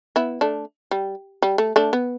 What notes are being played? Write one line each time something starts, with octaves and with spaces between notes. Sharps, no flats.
B3 E4
A3 D4
G3
G3
A3
A3 D4
B3